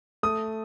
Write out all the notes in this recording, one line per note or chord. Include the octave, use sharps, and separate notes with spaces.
A3 D#6